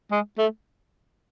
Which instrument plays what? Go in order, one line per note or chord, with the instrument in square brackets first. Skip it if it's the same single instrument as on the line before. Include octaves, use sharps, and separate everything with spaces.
[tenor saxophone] G#3
A3